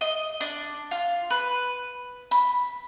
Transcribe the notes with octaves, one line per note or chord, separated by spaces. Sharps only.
D#5
D4
F4
B4
B5